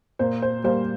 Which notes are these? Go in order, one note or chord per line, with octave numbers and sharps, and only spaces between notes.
A#2 C5
C5
G3 A#3 C5